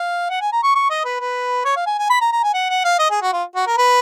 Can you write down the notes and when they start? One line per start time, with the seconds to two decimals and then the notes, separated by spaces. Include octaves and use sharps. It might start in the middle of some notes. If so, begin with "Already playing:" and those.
Already playing: F5
0.30 F#5
0.41 G#5
0.52 A#5
0.63 C#6
0.75 C#6
0.90 D#5
1.05 B4
1.20 B4
1.65 C#5
1.76 F5
1.87 G#5
1.98 G#5
2.10 B5
2.21 A#5
2.32 A#5
2.43 G#5
2.54 F#5
2.70 F#5
2.84 F5
2.99 D#5
3.11 G#4
3.22 F#4
3.33 F4
3.55 F#4
3.67 A#4
3.78 B4